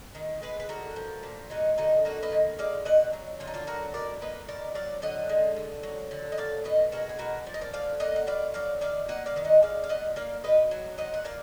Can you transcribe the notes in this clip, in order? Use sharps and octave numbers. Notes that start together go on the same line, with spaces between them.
D#3
G#3 G#4 B4
B4
D3 F#4 A#4
F3
A#2
G#3 D#4 F#4
D3 D#4 F#4
A#3 D#4 F#4
B4 D#5
D#3
G#3 D5 F5
B2 D#5 F#5
F#3
D3 F4
D#4
D4 F4
F#3 F#4 A#4
B2 A#4 D5
A#3 B4 D#5
B2 A#4 D5
F#3 D5 F5
D3 D#5 F#5
G#3
D3
F#3
D3
D#5
F#3 D5 F5
B2 B4 D#5
G#3 F#4 A#4
G#4
B2 F#4 A#4
F3 D5
D#5
A#4 D5
D3 D5 F5
A#3 D#5 F#5
F#5
B2 D5 F5
F#3 D5 F5
D#3 D5 F5
A#3 D#5 F#5
D5 F5
D#3 F5
D#5 F#5
G#3 D5 F5
F5
A#2 D#5 F#5
A#3 D5 F5
B2 B4 D#5
F#3
A#2 D#5 F#5
F#5
A#3 D5 F5